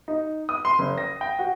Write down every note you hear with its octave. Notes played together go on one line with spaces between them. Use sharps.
D#4
D#6
C6
F#1
A#6
G5
F#4